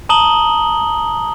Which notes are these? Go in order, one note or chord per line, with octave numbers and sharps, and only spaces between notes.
A5 A#5 D#6 F#7 G7